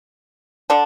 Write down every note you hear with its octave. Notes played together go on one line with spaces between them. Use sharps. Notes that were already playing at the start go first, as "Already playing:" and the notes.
D3 D4